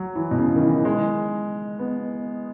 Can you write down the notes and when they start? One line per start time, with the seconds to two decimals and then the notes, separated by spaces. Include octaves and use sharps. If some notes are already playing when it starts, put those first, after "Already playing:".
Already playing: F#3
0.15 E3
0.31 B2
0.38 C#3
0.56 D#3
0.62 E3
0.85 G#3
1.79 B3